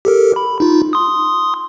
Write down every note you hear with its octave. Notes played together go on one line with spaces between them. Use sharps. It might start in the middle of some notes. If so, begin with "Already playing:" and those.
G4 A4 A#4
B5
D#4 F4
C6 D#6